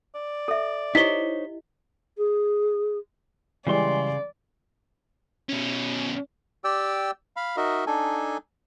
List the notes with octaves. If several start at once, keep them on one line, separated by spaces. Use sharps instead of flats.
D5
A4 E5
D#4 E4 G4 C5 C#5 D#5 B6 G7
G#4
C#3 E3 G3 G#3 D5 C6
B2 C#4
G4 D5 G5 E6
F5 B5
D#4 F#4 A#4 D#5 E5
D4 D#4 A4 G#5